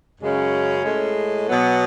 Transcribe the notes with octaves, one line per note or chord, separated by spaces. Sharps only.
F#2 C#3 G#3 C#4
A2 G#3
B2 F#3 B3